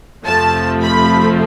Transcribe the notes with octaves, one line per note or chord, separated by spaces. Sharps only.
F2 C3 F3 A3 A5
B5